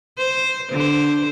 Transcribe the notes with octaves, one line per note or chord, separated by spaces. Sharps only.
C5
D3 C5